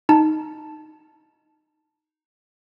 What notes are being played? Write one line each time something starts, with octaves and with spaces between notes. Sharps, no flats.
D#4 A5